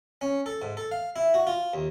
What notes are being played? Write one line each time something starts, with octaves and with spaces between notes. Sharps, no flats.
C#4
A4
G#2
A4
F5
E4
F#4
F4
D#2